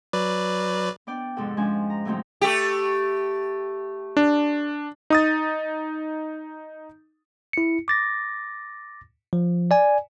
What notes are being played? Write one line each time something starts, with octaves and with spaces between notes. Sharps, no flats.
F#3 B4 D5
B3 D4 D5 G5
F2 G#2 C3 A4 F#5
F3 G#3 C#4 D4 G#5
A#5
A2 D3 F#3 C4 D#4
A3 G4
D4
D#4 D#6 A6
E4 C#7
D6 A6 A#6
F3
D5 G#5